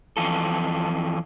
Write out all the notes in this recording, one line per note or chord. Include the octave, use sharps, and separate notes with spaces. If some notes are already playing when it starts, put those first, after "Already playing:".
F2 G#2 E3 F4 A4